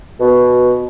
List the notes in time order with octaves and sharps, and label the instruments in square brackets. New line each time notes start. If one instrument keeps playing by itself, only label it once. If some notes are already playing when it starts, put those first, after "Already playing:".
[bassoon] B2